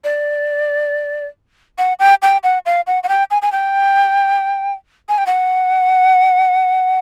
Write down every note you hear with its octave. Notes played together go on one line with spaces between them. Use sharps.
D5
F#5
G5
G5
F#5
F5
F#5
F#5
G5
G#5
G#5
G5
G#5
G5
F#5